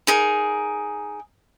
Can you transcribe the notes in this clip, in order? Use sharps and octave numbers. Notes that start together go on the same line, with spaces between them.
D#4 G#4 A#4